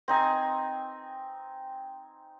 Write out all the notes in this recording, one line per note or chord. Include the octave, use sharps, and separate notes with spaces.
C4 D#4 G#5